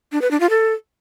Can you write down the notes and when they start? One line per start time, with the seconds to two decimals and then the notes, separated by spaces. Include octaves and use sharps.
0.12 D4
0.22 B4
0.31 D4
0.40 F4
0.50 A4